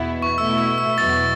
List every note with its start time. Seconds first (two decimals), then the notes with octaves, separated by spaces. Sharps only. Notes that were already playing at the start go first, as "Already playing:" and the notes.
Already playing: E2 B2 B3 E4
0.22 C#6
0.38 B2 A3 E4 E6
0.58 E6
0.78 E6
0.98 E2 B2 F#3 B3 E4 A6